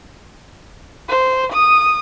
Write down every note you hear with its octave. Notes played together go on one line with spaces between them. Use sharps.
C5
D#6